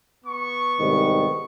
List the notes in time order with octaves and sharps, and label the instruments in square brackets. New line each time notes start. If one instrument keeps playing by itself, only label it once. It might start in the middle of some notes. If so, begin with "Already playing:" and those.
[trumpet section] B3 C#6
[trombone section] C2 G#2 D#3